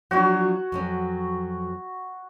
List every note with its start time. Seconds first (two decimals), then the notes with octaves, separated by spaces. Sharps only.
0.11 F3 F#3 D4 F#4 C#5
0.72 F2 F#3 C#4